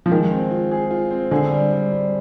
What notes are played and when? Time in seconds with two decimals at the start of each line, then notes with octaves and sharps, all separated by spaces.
0.06 F3
0.11 D#3 G#3
0.31 C4
0.51 F4
0.71 G#4
0.91 F4
1.11 C4
1.31 D3 G#4
1.51 G3
1.72 G3
1.92 G3